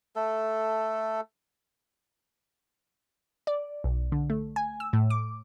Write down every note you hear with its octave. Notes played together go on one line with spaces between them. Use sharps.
A3 A4
D5
B1
D3
A3
G#5
E6
A2
D6